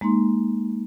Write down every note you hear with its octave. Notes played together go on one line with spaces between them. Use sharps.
G#3 A#3 D#4 C6